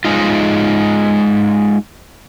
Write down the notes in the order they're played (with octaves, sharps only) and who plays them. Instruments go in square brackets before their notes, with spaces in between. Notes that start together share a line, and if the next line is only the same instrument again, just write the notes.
[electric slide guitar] G#3 D#4 F4